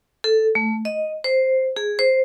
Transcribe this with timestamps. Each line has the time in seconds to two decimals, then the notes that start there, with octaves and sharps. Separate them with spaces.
0.24 A4
0.55 A3
0.85 D#5
1.24 C5
1.77 G#4
1.99 C5